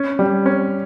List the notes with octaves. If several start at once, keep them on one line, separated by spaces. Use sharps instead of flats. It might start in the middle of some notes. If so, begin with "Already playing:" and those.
Already playing: C#4
G3
C#4